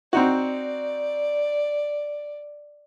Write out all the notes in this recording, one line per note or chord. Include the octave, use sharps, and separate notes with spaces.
C4 D#4 F#4 D5